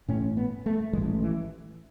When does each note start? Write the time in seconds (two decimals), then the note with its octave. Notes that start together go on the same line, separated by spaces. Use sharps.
0.08 A1 A2 C#4
0.37 B3
0.66 A3
0.93 A1 G#3
0.97 A2
1.23 E3